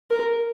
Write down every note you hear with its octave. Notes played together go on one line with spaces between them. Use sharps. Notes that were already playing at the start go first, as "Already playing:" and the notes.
A#4